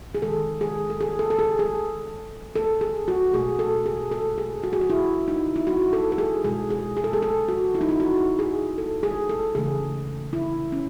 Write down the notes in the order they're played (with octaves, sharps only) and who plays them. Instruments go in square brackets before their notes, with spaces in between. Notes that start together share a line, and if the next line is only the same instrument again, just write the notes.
[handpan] G#4
D#3 G#3 A4
G#4
A4
G#4
A4
A4
G#4
G#4
A4
G#4
F#4
B2 A3 G#4
A4
G#4
A4
G#4
F#4
G#4
F#4
E4
D#4
E4
F#4
A4
A4
G#4
B2 G#3 G#4
G#4
G#4
A4
G#4
A4
F#4
E4
D#4
E4
F#4
G#4
A4
G#4
A4
C#3 E3 A3 G#4
E4
C#4